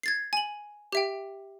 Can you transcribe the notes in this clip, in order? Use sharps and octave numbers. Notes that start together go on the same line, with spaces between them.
G#6 A6 C7
G#5 F#7
G4 E5 G5